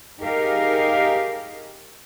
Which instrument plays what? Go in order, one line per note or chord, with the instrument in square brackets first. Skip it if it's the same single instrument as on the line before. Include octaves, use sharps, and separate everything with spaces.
[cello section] D#4 G4 G#4 A#4 F5